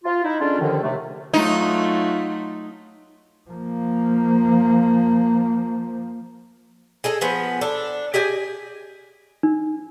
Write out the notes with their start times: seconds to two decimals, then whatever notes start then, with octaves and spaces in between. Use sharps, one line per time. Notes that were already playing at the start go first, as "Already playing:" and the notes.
0.04 F4
0.24 D#4 E4
0.39 D3 G#3 C#4 D4 F4
0.59 D#2 D3 D#3 F3
0.82 D#2 C3 A3
1.34 F#3 A3 D#4 F4
3.51 F3 A#3
7.04 G#4 A4 D#5
7.21 F3 B3 G#4
7.61 D4 A4
8.14 G4 G#4 D#5 G#5
9.43 D#4